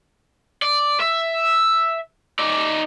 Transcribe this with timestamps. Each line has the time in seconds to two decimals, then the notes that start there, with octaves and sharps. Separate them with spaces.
0.62 D5
1.00 E5
2.39 D#4 D5